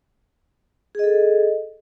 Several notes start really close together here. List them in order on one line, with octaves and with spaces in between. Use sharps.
G#4 D#5 A4